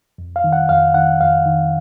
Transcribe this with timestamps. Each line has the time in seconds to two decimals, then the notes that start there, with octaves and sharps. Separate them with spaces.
0.18 F2
0.36 F5
0.44 D#3
0.53 F#5
0.69 F2 F5
0.94 D#3 F#5
1.21 F2 F5
1.45 D#3